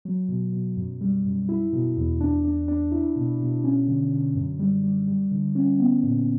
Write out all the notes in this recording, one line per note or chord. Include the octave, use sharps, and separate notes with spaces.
F#3
B2
B2
F#2
G3
F#2
E4
B2
E2
D4
D4
D4
E4
B2
B2
C#4
D3
D3
F#2
G3
G3
G3
D3
C#4
B3
A#2